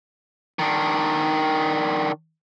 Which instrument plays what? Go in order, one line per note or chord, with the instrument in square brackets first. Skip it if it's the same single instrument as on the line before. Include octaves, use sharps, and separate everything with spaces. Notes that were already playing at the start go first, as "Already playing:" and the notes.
[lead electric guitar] D#3 D4